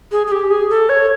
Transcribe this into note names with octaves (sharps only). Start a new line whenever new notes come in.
G#4
G#4
G4
G#4
A4
C#5